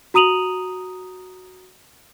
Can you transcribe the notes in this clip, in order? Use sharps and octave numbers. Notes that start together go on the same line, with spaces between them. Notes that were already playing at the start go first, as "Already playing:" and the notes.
F#4 A#5 D#6 D#7 F7 F#7